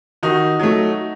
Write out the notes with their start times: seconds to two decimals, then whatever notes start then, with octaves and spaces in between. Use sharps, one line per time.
0.23 D#3 D#4 F#4
0.60 F#3 A3